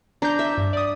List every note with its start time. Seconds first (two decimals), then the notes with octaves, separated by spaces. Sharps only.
0.22 D4 A#5 G6
0.39 E5
0.57 G2
0.73 D5 D#6